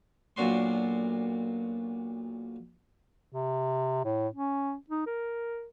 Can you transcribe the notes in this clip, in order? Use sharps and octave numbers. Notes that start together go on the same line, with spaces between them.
B1 A#2 D4 F#4 C6
C3
A2
C#4
D#4
A#4